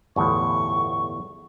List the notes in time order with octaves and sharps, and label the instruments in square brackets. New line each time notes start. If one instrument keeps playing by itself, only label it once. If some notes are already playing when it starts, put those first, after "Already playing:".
[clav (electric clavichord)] G1 E2 A2 [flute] C#6